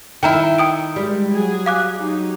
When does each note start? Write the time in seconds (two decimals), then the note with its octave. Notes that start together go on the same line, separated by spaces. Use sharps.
0.23 D#3 E4 G5 A#5
0.58 G5 D#6 D7
0.96 G3 G#3
1.32 F#3 G#4 G#5
1.66 F5 D6 F#6
1.97 F#3 D#4 G4